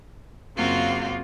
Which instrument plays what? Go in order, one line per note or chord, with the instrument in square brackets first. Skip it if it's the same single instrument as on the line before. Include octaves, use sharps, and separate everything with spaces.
[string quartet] F#2 C#3 A#3 C4 F4 F#4